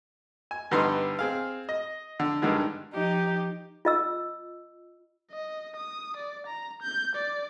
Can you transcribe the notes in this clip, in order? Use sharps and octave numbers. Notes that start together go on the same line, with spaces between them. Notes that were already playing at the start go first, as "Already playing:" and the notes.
G#5
G2 D3 B3 D#4 C6
C4 G#4 F5
D#5
D3
G2 D3 D#3 G#3
F3 D#4 G4
F4 D#5 E6
D#5
D#6
D5
A#5
G6
D5